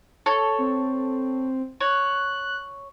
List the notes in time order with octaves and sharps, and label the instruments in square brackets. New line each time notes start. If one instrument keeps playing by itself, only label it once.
[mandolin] A4 C#5
[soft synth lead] C4
[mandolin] C#5 [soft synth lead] F#6